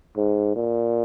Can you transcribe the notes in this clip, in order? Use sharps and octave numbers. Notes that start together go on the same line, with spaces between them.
G#2
A#2